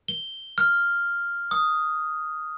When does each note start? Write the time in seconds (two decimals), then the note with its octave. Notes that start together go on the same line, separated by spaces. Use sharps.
0.08 G7
0.58 F6
1.51 D#6